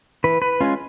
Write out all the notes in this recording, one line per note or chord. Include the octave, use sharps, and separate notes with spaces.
E3 B4
B4
G#3 C#4 F4